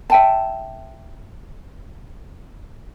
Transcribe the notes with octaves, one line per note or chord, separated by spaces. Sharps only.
E5 G5 A5